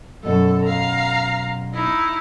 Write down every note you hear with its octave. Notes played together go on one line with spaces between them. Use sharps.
F#2 B2 A3 A4
F5 A#5
D#4 E4